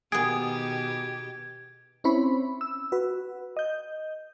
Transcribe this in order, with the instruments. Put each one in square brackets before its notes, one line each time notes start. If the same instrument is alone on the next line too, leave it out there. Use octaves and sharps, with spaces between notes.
[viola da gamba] B2 D#3 G4 [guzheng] B3 G#4 [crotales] G#6 D7
[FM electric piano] C4 C#4 E4 C5 C#5 B5
E6
F#4 B4
D#5 G6